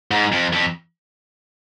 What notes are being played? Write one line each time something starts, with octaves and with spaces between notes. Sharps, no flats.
G#2
F2
F2